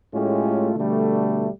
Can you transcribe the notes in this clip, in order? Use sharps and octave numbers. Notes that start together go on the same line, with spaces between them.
A2 G#3 A3 C#4 F4 G4
B2 D3 G3 A3